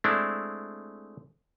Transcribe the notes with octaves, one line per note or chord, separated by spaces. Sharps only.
G#3 A3 C4 D4 E4